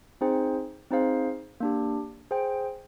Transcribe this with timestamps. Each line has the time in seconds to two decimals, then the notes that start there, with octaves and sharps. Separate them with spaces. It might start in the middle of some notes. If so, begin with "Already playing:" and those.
0.21 C4 D#4 G#4 C5 G5
0.91 C4 D#4 G#4 C5 F5
1.60 A#3 D4 G4
2.31 G#4 C5 G5